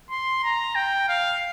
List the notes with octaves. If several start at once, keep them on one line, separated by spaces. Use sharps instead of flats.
C6
A#5
G5
F5